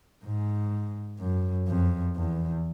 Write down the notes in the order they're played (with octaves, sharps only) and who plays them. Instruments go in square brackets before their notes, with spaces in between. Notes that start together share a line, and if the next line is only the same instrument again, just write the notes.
[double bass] G#2
F#2
F2
E2